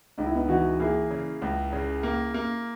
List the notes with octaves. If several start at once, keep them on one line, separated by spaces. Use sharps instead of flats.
C#2 D#4
E4
B3 D#4
E3 D#4 F#4
A#3 E4 G#4
C#3
C#2
C#3
A#3
A#3